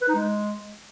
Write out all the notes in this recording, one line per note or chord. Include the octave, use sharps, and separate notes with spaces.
B4
D#4
G#3